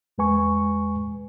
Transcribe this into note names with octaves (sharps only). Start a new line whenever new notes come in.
E2 G#3 B4 G#5 C#6